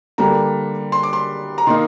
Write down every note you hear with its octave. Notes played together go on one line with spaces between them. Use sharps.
D3 G3 A#3 A#5
C6
D6
C6
A#5
D#3 A#3 D#4 C6